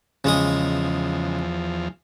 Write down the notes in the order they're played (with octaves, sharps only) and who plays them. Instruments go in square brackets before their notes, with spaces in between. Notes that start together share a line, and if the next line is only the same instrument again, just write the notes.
[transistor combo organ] E2 F3 [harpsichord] C#3 G#3 D#6